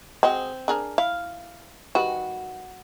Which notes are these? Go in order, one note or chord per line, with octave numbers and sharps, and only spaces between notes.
G#3 C4 F#4 D#5
D4 G#4 A#4
E4 F5
D#3 G3 F#4 B4